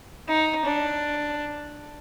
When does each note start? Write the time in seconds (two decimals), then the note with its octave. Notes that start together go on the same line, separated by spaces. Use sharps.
0.28 D#4
0.65 D4